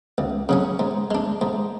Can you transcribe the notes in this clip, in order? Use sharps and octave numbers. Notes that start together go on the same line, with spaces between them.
C#2
C#3 F#3 C#4
G#2
G#3 D4
G#2